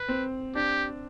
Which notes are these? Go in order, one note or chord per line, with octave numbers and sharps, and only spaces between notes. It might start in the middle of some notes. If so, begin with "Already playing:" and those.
Already playing: B4
C4
D4 G4